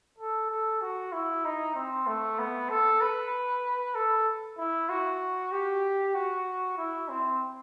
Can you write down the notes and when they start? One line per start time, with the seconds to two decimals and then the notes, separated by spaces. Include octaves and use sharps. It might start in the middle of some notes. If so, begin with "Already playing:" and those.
0.19 A4
0.50 A4
0.81 F#4
1.12 E4
1.45 D#4
1.76 C4
2.07 A3
2.39 B3
2.70 A4
3.01 B4
3.95 A4
4.58 E4
4.90 F#4
5.52 G4
6.15 F#4
6.77 E4
7.09 C4